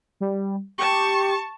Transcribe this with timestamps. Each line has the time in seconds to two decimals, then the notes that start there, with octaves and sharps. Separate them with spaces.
0.21 G3
0.78 G4 A5 C#6